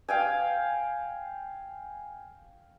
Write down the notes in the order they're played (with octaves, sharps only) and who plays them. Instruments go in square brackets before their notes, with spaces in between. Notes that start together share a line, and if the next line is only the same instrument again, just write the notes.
[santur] F5 G5 G#5